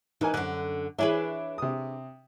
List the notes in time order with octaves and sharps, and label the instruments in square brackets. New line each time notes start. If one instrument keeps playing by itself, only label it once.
[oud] E3 [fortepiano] D#4 A#4 G#5
[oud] F#2 D3 [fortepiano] F#6
[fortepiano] E3 C#5 E5 [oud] D4 G#4 B4
[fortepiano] C3 D#6